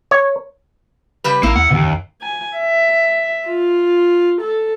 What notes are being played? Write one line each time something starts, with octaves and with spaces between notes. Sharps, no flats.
C#5
C#3 G3 B4
A1 A#3 E4 A#4
D#2 F#5
D#2 B2 D3
F#2
G#5
E5
F4
A4